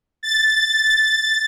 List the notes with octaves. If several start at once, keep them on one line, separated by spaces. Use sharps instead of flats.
A6